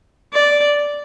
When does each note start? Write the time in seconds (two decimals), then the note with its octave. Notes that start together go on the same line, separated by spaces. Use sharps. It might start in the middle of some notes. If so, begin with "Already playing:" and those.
0.33 D5